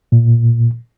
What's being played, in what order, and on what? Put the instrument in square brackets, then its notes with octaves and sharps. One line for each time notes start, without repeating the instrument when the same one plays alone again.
[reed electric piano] A#2